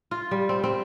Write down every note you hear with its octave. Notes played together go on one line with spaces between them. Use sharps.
F4
G3
C4
C4